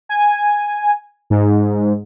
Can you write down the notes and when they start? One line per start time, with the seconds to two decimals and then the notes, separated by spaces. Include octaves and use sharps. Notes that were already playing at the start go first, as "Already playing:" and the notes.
0.09 G#5
1.30 G#2